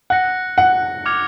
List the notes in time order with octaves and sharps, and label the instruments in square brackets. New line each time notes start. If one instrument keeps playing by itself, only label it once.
[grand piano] F#5 [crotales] F#6 A#6 C#7
[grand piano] F#5
[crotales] D6 F6 G#6 C#7 F7